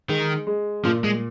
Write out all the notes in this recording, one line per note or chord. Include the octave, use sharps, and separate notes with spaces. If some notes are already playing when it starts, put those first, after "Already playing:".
D#3 G#3
G#3
A#2 F3
G#3